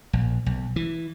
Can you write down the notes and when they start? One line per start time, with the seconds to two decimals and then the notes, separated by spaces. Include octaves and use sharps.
0.13 A#1
0.46 B1
0.76 E3